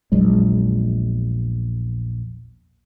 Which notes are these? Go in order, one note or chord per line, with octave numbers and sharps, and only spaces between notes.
A#1 E2 F#3 G#3